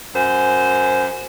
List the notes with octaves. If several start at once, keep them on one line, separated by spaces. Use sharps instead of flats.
F#2 C5 G#5